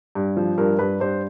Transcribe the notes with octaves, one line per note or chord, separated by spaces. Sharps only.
G2
F3
G2 A#4
G2 B4
G2 C5